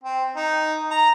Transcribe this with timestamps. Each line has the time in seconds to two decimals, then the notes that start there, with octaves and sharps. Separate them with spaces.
0.03 C4
0.36 D#4
0.91 A#5